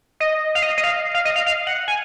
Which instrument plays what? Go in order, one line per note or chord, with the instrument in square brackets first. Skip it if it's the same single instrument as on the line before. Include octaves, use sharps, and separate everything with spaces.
[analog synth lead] D#5
F5
D#5
D#5
F5
F5
D#5
F5
F5
F#5
G#5